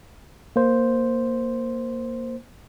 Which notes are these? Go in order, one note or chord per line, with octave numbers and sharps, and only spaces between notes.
A#3 C5